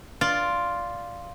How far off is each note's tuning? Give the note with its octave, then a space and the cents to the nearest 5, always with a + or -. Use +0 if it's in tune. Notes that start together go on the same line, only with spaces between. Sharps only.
F4 +0 D5 +0